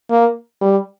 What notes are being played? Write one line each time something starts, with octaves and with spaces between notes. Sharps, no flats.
A#3
G3